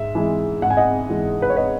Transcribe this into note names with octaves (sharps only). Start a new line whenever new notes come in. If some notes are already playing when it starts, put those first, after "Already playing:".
Already playing: G#2 E5
E3 G#3
G#2 F#5
G#5
D#5 F#5
E3 G#3
B4
C#5
B4 D#5